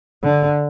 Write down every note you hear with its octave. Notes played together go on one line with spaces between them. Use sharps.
D3